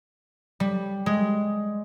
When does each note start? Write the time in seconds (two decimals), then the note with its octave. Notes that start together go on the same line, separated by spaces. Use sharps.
0.60 G3
1.06 G#3